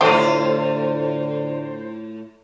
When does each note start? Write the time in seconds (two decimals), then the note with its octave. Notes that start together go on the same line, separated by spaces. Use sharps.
0.01 A2 D3 A3 F4 G4 C5